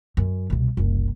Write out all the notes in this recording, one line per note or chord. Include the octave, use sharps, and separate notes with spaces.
F#2
C2 B2
F#1 C2